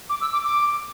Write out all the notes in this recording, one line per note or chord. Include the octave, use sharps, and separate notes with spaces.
D6
E6
D6
D6